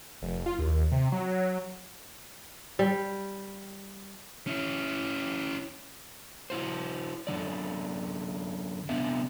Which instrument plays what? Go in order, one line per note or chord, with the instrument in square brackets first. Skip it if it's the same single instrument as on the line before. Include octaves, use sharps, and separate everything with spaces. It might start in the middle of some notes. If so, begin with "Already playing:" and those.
[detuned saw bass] F1
F4
D#2
C3
F#3
[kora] G3
[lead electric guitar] C#4 E4
[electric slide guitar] E4 F#4 C5
F#2 D3 E3 D5
C3 B3 D4 E5